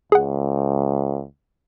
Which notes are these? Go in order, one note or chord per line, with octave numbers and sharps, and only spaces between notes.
C#2 G#4 F#5